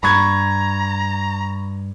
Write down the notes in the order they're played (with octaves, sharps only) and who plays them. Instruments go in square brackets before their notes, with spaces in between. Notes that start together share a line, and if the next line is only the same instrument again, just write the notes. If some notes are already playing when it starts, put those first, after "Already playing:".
[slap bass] G2 [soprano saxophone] A#5 [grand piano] B5 C#6 G#6